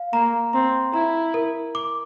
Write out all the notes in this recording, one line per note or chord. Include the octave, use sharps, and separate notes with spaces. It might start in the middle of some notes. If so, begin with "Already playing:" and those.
Already playing: F5
A#3 A#5
C4 A#5
E4 A#5
A#4
D6